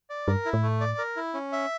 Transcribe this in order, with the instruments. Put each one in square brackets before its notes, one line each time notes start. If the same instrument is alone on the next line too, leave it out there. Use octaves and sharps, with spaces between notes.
[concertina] D5
[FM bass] G2 [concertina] A#4
[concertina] E4
[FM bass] A2
[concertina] A3
D5
A#4
E4
C#4
E5